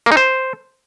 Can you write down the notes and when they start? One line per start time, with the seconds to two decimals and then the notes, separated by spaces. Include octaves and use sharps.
0.06 A#3
0.12 D#4
0.17 C5